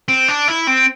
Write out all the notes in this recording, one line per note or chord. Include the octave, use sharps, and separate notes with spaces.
C4
D4
E4
C4